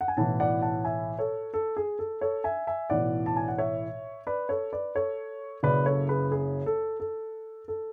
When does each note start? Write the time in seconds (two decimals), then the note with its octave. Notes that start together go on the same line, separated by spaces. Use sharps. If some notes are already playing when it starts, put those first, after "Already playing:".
0.01 F#5
0.08 G#5
0.17 B1 A2 E3 F#5 A5
0.40 D5 F#5
0.62 F#5 A5
0.84 E5 G#5
1.19 A4 C#5
1.54 A4
1.77 G#4
1.99 A4
2.21 A4 C#5
2.44 E5 G#5
2.67 E5 G#5
2.90 B1 A2 E3 D5 F#5
3.26 A5
3.36 G#5
3.48 F#5
3.58 C#5 E5
4.27 B4 D5
4.49 A4 C#5
4.72 B4 D5
4.95 A4 C#5
5.63 F#1 F#2 C#3 B4 D5
5.86 A4 C#5
6.09 G#4 B4
6.32 G#4
6.66 A4
7.00 A4
7.68 A4